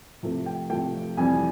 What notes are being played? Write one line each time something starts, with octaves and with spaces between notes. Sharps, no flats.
C3 F3 A3
G5
C3 F3 A3 G5
F2 C3 E3 G3 G#5